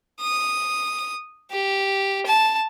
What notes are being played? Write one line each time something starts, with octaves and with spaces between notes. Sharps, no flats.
D#6
G4
A5